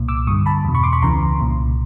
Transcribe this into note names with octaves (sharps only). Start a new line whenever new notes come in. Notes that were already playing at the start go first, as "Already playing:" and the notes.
Already playing: C2 A#2
D6 E6
G2 D3 C#6 D#6
A5 B5
E2 B2
B5 C#6
C6 D6
B5 C#6
C#2 C#3 E3 A#5 C6
C2 A#2